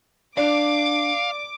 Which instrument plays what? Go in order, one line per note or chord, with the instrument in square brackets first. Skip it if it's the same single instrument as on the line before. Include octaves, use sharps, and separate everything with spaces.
[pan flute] D4 [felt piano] D5 [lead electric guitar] F5 [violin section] D6